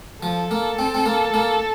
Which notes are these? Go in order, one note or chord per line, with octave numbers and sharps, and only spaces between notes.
F3 A4
A#3
C4
C4
A#3
A#3